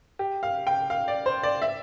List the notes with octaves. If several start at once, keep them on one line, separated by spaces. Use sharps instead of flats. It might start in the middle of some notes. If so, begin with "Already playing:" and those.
G4
F5
G5
F5
D5
C5
D5
E5